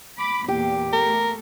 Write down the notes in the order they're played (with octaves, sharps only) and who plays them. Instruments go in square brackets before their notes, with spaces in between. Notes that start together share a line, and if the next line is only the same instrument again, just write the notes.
[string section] B5 D6
[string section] E2 A#2 [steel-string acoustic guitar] G4
[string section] A3 [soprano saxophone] A#4